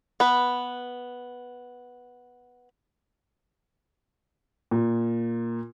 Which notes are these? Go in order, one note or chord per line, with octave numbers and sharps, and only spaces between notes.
B3 B4
A#2